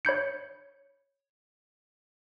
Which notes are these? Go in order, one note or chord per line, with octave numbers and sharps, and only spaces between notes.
C#5 B5 G6 C#7